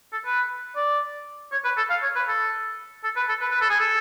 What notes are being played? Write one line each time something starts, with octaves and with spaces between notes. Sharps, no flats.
A4
B4
D5
C#5
B4
A4
F5
C#5
B4
A4
A4
B4
A4
B4
B4
A4
G#4
A4